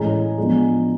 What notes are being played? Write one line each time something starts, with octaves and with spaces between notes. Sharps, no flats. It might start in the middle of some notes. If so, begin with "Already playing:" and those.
Already playing: A2 E3 G#3 C#4 G#5 A#5
F3 G#3 B3 D4